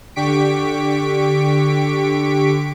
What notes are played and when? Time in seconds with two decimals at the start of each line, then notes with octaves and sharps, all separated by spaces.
0.16 D3 G4 C#6 B6 D7